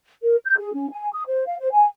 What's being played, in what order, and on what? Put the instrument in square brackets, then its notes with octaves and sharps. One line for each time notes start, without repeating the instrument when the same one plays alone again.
[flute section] A#4
G6
G#4
C#4
G#5
D#6
C5
F5
C5
G#5